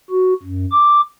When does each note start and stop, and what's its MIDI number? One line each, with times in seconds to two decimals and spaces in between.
0.11 0.34 66
0.43 0.66 42
0.72 1.01 86